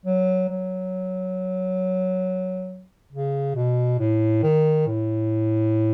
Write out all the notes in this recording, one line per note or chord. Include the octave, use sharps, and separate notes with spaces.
F#3
F#3
C#3
B2
A2
D#3
A2